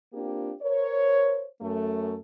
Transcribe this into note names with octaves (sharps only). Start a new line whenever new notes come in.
A#3 C4 D4 F4 G4
A#4 C5 C#5
F#2 A3